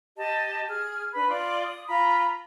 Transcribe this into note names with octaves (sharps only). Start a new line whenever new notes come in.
G4 D#5 A5
G#4 F6
D4 B4 B5
F4 D5 C6
D#6
F4 A#5 B5